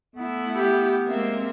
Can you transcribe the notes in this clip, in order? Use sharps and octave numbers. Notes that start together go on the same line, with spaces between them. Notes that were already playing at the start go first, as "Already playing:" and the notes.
A3 B3 E4
G4
G#3 A#3 C4 E5